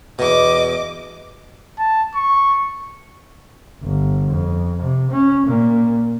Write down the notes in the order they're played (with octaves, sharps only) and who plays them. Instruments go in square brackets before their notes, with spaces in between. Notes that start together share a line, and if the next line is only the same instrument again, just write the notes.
[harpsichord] E2 B2 [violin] D#5 D6
[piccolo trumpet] A5
C#6
[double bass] G1
F2
C3
C#4
A#2